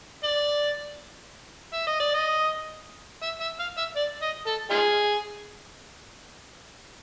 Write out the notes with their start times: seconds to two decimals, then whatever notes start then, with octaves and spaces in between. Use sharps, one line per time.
0.24 D5
1.73 E5
1.87 D#5
2.00 D5
2.14 D#5
3.22 E5
3.41 E5
3.60 F5
3.77 E5
3.96 D5
4.22 D#5
4.47 A4
4.70 D#4 F4 G#4